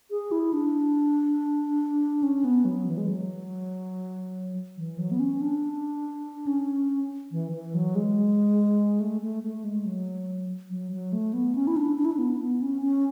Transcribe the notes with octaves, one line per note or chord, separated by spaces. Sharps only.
G#4
E4
D4
C#4
B3
F#3
E3
G#3
F#3
E3
F#3
B3
C#4
D4
C#4
E3
E3
F#3
G#3
A3
A3
A3
G#3
F#3
F#3
F#3
A3
B3
C#4
E4
D4
D4
E4
D4
B3
B3
C#4
C#4